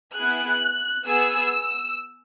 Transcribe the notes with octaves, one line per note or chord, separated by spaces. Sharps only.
B3 E4 G#4 F#6
B3 G#4 E6